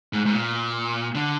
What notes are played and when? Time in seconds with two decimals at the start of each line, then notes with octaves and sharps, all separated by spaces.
0.13 G#2
0.26 G#2
0.33 A#2
1.15 D3